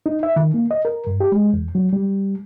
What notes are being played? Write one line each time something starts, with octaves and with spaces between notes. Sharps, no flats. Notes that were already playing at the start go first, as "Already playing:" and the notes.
D#4
E5
D#3
A#3
D#5
A#4
G2
G4
G#3
E2
F#3
G3